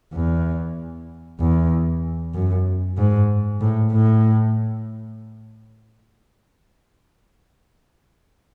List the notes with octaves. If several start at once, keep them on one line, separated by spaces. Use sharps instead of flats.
E2
E2
F#2
G#2
A2
A2